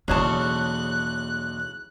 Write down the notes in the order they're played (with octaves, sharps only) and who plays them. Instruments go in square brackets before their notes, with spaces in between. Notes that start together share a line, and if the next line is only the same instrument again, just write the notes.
[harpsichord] B1 E2 [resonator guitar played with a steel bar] C#3 C#5 A5 [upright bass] E3 A#3 [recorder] F#6